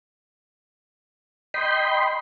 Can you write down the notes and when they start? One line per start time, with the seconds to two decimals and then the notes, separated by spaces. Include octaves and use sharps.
1.54 D#5 G5 B5 C6